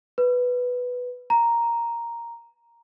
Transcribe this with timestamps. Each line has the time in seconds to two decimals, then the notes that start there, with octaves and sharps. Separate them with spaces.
0.18 B4
1.30 A#5